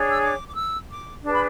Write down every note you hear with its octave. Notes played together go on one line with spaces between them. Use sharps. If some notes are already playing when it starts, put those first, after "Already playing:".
Already playing: D4 G#4 C#5
E6
D6
D6
E6
D6
D4 G#4 B4 A5
B5